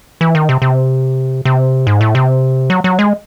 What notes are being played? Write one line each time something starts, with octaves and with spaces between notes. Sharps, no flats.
E3
D#3
C3
C3
C3
G#2
A2
C3
F#3
F#3
G#3